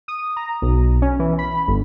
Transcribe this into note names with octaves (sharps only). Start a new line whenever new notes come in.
D#6
A#5
B1
C#4
E3
B5
G1